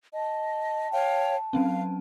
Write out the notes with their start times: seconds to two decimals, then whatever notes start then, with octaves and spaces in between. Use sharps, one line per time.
0.14 D#5 A5
0.92 C#5 F5 G5
1.53 F#3 C4 C#4 F5